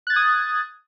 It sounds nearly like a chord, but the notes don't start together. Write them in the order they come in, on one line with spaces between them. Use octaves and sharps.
F#6 A6 G#6 D#6